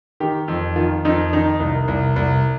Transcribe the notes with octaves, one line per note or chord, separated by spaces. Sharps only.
D#3 G4
F2
D#3 F4
F2 D#4
D#3 D#4
C2
C2
C2